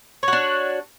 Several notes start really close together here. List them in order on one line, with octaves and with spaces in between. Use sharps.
C#5 F#4 D4